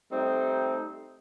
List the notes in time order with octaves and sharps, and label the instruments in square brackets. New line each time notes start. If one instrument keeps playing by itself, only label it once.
[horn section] G3 A3 C4 D#4